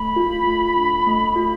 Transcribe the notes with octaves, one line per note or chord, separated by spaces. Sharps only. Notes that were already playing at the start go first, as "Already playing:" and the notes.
Already playing: A3 B5
F4
A3
D4
A3
F4